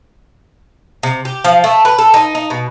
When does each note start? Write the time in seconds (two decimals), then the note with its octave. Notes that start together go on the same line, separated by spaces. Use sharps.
1.03 C3
1.25 G4
1.45 F3
1.64 A3
1.85 B4
1.98 A4
2.14 D#4
2.35 D#4
2.50 B2